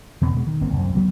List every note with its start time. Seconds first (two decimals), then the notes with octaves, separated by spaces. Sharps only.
0.21 E2 B2 B3 C4
0.33 B2 G#3
0.47 D#3
0.61 G1 A#3 C4
0.73 C2 F#2
0.95 D2 F#3 B3